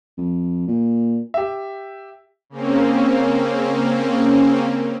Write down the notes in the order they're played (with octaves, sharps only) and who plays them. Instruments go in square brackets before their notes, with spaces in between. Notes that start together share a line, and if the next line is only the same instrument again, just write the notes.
[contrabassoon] F2
A#2
[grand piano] G4 E5
[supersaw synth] C#3 A#3 C4 C#4